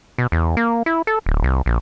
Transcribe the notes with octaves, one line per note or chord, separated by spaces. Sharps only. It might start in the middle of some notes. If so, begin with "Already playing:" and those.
B2
E2
A#3
E4
A4
D1
C2
A#1